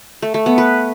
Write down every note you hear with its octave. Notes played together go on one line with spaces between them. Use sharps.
A3
A3
B3
B4